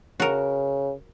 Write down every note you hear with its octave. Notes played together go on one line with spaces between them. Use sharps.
C#3 F#4 A#4